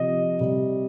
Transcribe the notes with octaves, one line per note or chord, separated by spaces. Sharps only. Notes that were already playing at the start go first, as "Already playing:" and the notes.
Already playing: C3 F3 D#5
C3 G3